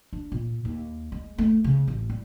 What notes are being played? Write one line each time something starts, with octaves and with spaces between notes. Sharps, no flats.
D4
A#2
D#2
G#3
A3
C#3
A1
G3